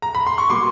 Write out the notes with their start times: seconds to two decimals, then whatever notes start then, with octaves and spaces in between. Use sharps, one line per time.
0.02 A#5
0.15 B5
0.27 C6
0.38 C#6
0.50 B2 G3 A#3 C6 D6